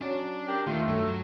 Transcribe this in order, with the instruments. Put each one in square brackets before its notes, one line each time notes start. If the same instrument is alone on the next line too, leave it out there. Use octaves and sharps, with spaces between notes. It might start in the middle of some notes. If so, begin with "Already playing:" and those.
[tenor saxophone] F#3 [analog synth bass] C#4 [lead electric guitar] D4 D5
[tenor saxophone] G4 [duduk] A#4
[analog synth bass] D#2 [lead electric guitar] D#3 [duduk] A3 [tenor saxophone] F4
[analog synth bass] G2 [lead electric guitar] F#3 [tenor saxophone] A4